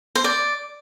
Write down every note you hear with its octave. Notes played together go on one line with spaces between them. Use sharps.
C5
D5